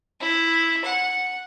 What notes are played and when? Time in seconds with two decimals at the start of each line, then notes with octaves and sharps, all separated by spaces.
0.20 E4
0.84 F#5